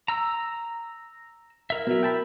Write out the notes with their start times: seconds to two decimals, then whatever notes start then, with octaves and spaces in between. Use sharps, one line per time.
0.08 A#5 E6
1.70 E4 A#4 E5
1.87 B2 F#3
2.03 G5 A5 B5